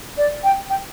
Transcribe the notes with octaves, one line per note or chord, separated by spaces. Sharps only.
D5
G5
G5